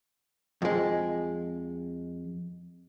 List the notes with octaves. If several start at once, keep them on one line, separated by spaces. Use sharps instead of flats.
F2 G#3